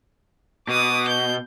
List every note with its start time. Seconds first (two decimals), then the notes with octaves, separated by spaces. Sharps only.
0.68 B2 D6 D#6
1.08 G6